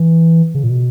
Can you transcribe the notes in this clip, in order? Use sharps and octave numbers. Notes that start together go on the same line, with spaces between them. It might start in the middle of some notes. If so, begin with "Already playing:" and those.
Already playing: E3
C#3
A#2
B2